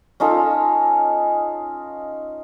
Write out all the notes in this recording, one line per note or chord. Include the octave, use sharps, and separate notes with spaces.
C#4 D#4 F4 A4